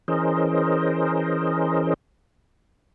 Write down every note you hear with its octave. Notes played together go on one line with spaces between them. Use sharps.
E3 C#4 G#4 A#4 C5 D#5